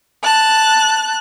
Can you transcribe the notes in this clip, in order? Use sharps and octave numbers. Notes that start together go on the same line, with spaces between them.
A5 F#6